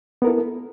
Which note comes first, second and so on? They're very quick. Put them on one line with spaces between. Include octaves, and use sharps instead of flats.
B3 A#4 E4 A4